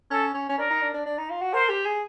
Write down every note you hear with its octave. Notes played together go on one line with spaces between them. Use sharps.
C#4 A4
C#4
C#4
D4 A#4
D#4
D4
D4
D4
D#4
F4
F#4
A#4 C5
G4
G#4